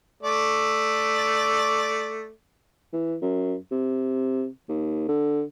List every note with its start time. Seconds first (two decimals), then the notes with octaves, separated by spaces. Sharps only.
0.23 A3 D5
2.93 E3
3.22 F#2
3.71 C3
4.69 D#2
5.09 D3